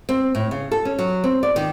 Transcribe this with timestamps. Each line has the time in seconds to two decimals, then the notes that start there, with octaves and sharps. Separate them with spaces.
0.09 C4
0.35 A2
0.51 C#3
0.71 A4
0.85 C#4
0.99 F#3
1.24 C4
1.43 D5
1.56 D#3